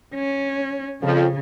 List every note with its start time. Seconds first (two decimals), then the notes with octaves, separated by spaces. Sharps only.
0.14 C#4
1.02 F2 C#3 F3